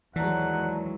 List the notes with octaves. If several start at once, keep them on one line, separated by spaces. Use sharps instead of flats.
D#2 E3 F#3 G#3 D5 F#5 A5 A#5